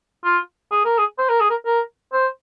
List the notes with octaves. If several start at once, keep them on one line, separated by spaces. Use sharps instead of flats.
F4
G#4
A#4
G#4
C5
A#4
G#4
A#4
A#4
C5